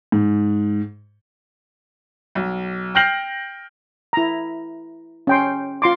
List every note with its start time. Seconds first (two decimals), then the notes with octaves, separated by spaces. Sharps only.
0.12 G#2
2.35 B1
2.95 G5 F6 G6 A#6 C7 F#7
4.13 E4 A#5
5.27 C#4 G5 C6
5.82 F4 C6 D6